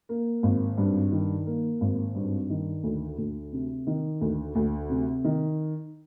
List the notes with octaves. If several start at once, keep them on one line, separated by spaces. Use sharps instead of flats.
A#3
G#1
G2
D#3
A#3
G#1
G2
D#3
D2
D2
C3
D#3
D2
D2
C3
D#3